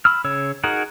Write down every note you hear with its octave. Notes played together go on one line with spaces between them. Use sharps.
B5 E6 F6
C#3 C#5 E6
D#4 F#4 G#4 A#4 F#5